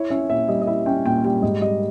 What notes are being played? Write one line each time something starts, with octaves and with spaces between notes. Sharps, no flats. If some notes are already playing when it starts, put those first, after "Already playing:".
Already playing: E4 C#5
C#4 E5
A#2 E5
G3 D#5
D#5
E4 E5
C#4 G5
A#2 G5
G3 G5
G#2 D#5
G3 D#5